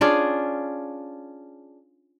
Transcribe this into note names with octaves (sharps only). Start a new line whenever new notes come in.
C#4 D4 F4 G#4